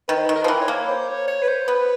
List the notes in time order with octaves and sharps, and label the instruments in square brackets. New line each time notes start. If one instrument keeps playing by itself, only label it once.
[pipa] D#3 [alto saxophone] B4
[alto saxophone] C5
B4
[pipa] D#3
[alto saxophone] A#4
[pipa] F3 [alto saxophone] B4
[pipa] E3 [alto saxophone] A#4
[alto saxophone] C#5
[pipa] A#3
[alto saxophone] C5
C#5
C#5
B4
C5
[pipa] B3 [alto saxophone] B4